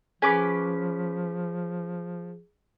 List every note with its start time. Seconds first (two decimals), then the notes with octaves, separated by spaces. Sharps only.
0.22 F3 C#4 G#4 B4 G#5 D6